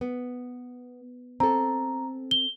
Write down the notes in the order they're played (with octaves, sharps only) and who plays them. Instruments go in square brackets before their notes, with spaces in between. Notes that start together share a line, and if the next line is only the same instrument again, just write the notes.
[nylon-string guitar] B3
[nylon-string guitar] C4 A4 [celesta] A#5
[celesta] G7